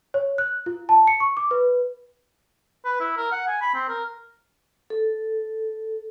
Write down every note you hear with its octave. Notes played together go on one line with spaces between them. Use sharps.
C#5
F#6
F4
A5
C#7
C#6
D6
B4
B4
E4
A#4
F#5
G#5
B5
C4
A#4
A4